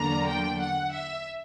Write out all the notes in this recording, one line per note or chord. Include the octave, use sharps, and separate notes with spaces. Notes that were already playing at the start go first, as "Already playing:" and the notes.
Already playing: E2 D3 F#3 A#3 D4 A#5
G5
F#5
E5